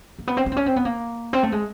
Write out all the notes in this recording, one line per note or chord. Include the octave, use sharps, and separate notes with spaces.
A#3
B3
C4
C#4
C4
C#4
C4
B3
A#3
C4
A3
G#3